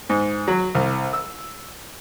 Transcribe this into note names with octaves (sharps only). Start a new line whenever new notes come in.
G#2
F#3
C2
E6